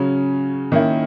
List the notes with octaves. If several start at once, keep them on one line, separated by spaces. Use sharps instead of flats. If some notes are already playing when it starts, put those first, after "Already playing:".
Already playing: C#3 F#3 C#4
D#3 A#3 C#4 E4